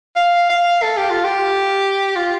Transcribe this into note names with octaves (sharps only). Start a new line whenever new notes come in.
F5
F5
A4
G4
F4
G4
F4